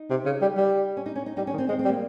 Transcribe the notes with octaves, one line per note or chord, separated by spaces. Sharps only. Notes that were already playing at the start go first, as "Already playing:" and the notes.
Already playing: D#4
C3
C#3
G3
G3
C#4
D#4
C#4
D#4
G3 D#4
C#4
D#3
C4
G#3 C4
C4
G3
A#3